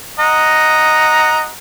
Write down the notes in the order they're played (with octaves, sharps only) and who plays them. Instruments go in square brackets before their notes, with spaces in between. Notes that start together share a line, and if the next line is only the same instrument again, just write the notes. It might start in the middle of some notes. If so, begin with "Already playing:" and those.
[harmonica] D#5 F#5 A#5